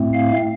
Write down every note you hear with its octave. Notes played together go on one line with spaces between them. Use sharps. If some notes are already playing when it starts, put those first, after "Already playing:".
Already playing: A2 A3 C4
F5